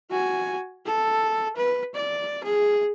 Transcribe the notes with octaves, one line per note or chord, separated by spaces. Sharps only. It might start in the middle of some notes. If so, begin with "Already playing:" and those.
F#4 G#5
A4
B4
D5
G#4